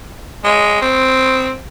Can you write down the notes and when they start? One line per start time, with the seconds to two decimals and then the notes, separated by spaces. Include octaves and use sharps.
0.44 G#3
0.82 C4